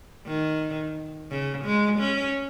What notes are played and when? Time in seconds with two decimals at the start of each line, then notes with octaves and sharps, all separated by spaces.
0.27 D#3
1.30 C#3
1.65 G#3
1.99 C#4